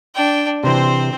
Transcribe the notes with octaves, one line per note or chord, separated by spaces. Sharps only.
D4 G5
C3 E3 C4 C5